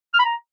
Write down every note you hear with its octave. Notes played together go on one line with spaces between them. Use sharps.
F6
B5
A#5